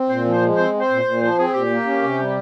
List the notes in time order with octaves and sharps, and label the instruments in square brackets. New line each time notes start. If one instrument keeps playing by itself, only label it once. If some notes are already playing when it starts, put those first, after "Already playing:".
Already playing: [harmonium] C4
[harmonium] A#2 [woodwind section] C5
[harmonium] F3
[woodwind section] C5
[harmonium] G#3
[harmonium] C4 [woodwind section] C5
[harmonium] C4
[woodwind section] C5
[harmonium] A#2
A#2
[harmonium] F3 [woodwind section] C5
[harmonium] C4 [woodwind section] G#4
[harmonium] A#2 [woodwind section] G4
[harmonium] A#3
C#4
C3
G3